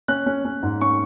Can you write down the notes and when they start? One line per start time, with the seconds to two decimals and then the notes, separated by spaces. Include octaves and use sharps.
0.08 C#4 F#6
0.26 C#4
0.45 C#4
0.63 G#2
0.81 C#4 C#6